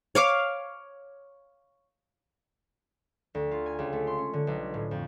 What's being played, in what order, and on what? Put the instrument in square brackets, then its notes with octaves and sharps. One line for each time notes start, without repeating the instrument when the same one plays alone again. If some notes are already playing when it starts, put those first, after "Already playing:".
[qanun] C#5 F5 D6
[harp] D2
F4
G#5
C#2
A3
C6
C#4
D3
B1
A2
F2